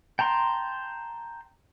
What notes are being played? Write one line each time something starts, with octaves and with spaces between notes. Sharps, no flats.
G5 A5 A#5 C6